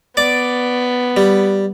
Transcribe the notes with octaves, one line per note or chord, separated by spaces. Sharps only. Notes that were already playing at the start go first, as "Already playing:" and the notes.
B3 D5 D6
G3